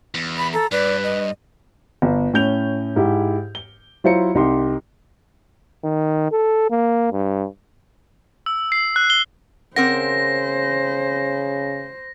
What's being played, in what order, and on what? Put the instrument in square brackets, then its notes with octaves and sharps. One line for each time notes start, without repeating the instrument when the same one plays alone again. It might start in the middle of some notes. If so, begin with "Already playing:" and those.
[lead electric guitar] E2
[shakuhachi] B5
[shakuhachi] A4 [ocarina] A#5
[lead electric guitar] G2 [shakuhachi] B4 [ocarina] D5
[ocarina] D#5
[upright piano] G1
A2 C#4 G6 F7
G#2 E4 G4
G7
F#3 E4 F4 C5 A#5 C#7
C2 D#4 G4 C6
[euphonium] D#3
A4
A#3
G2
[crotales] E6
C7
F#6
G7
[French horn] C#3 [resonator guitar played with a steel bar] C4 A#4 F#5 [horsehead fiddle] C5 [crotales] A#6